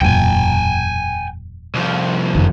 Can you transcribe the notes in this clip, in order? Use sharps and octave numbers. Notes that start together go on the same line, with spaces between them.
E1 F#2 A#2 G5 G#5
C2 F3
F#1 F2 D#3